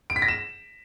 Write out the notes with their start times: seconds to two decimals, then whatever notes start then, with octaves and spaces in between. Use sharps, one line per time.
0.10 D7
0.16 B6
0.22 A#6
0.28 E7